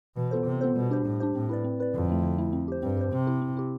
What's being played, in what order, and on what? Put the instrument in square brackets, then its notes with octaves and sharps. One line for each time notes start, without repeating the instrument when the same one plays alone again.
[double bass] B2 [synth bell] E3
[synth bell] B3 F4 A4 C5
[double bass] C3 [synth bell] E3
[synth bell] B3 F4 A4 C5
[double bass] B2 [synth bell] G3
[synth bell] D4 G4 C5
[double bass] A2 [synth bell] G3
[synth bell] D4 G4 C5
[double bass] A2 [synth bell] C4
[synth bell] E4 B4 D5
C4
E4 B4 D5
[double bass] F2 [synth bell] D3
[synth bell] A3 E4
D3
A3 E4
C4
G4 C5
[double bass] G2 [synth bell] C4
[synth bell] G4 C5
[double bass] C3 [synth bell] C4
[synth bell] E4 G4
C4
E4 G4